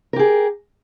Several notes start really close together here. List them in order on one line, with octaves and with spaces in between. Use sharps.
A#4 G4 G#4